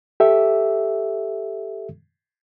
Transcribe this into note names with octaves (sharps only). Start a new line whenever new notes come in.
G4 A4 E5